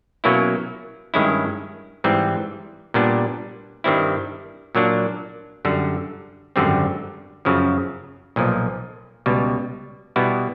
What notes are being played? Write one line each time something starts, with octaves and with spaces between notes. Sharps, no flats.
B2 F#3 A#3 C#4 E4
G2 D#3 G#3 C#4 E4
G#2 E3 G3 C4
A#2 G3 B3 D4
G2 D#3 G3 C4 E4
A#2 F#3 A#3 D4
F#2 D3 G3
G#1 F#2 D3 G3 C4
F#2 C#3 F3
B1 A#2 F3
C#2 B2 G3
B2 G3 B3 E4